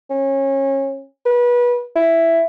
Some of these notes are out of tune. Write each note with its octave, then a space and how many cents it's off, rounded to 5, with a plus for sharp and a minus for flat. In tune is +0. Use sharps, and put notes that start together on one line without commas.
C#4 -25
B4 -25
E4 +5